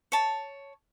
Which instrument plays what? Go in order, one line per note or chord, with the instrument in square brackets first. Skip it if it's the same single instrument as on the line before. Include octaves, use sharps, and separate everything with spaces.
[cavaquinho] C#5 A5